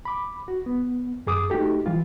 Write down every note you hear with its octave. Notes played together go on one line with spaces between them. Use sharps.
B5 D6
F#4
B3
F#2 G#4 D6 D#6
A3 D#4 F#4 G4 A4
E3 G3 F4